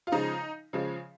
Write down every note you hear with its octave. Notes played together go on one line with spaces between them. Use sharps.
F4
C#3 F3 G#3 D#4
C#3 F3 G#3